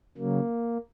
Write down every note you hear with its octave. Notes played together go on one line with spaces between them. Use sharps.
C#3 F#3 A#3